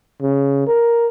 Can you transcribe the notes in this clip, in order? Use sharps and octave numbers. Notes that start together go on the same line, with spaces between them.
C#3
A#4